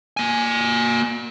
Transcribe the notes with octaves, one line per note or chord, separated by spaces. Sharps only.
A#3 G#5